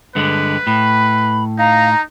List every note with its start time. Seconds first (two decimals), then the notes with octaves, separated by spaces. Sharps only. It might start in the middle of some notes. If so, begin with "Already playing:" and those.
0.15 G2 D3 G#3 B4
0.67 A2 B5
1.58 D#4 F5 A#5